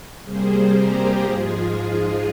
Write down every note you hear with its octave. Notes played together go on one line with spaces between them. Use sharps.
C3 G3 A#3 G#4 C5
G4 A#4
G#2 F3 G#3 F4 G#4